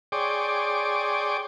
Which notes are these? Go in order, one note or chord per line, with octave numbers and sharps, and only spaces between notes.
G#4 C#5 D5 G5 C6 D6